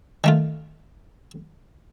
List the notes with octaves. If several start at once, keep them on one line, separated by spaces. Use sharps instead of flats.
D#3 A3 F4